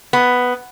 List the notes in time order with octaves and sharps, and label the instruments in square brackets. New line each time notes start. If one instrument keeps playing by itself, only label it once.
[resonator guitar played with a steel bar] B3